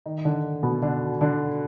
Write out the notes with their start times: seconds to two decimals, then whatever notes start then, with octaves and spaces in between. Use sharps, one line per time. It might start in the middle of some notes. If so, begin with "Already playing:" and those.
0.06 D#3 D#4
0.18 D#4
0.25 D3 D4
0.63 B2 B3
0.82 D3 D4
1.21 D3 D4